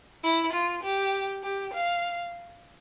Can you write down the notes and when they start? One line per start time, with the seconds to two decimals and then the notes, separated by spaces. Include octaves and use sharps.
0.24 E4
0.53 F4
0.83 G4
1.43 G4
1.74 F5